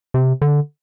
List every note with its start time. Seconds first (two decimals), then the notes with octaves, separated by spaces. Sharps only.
0.14 C3
0.42 D3